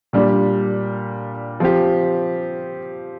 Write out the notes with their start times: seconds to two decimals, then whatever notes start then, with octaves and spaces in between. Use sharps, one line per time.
0.13 A#2 G3 D4 G4
1.60 F3 C4 G4